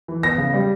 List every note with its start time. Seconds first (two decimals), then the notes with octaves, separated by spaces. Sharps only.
0.08 E3
0.23 B3 A#6
0.38 C#3
0.54 G3